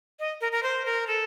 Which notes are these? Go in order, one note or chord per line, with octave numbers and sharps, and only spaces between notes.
D#5
A#4
A#4
C5
A#4
A4